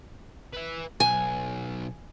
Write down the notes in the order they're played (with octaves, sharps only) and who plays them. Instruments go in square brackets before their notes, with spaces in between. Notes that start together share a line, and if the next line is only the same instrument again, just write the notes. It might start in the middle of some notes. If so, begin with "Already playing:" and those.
[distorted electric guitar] B4 E5
[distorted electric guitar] B1 [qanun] G#5